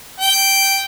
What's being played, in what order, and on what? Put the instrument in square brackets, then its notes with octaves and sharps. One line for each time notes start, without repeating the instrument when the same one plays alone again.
[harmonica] G5